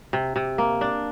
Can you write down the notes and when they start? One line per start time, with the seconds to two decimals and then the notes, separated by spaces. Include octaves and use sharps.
0.13 C3
0.36 C3
0.58 A#3
0.81 D4